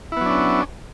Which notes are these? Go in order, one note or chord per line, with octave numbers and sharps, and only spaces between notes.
F#3 B3 C#4 D4 E4